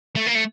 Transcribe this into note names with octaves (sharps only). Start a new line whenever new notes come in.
A3
A#3
A3